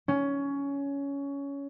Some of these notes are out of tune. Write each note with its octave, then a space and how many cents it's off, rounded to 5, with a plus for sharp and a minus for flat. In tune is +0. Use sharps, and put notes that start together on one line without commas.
C#4 +15